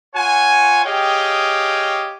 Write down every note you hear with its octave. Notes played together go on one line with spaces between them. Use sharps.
F4 C#5 F#5 G#5
G4 G#4 C#5 D#5 F5 G5